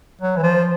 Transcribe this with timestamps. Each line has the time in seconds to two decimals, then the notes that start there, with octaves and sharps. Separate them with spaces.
0.21 F#3
0.37 E3
0.43 F3